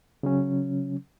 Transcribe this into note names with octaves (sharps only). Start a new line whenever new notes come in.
C#3 F#3 C#4